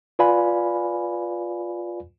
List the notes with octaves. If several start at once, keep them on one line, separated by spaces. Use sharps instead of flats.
F4 B4 D5 F5 G#5 B5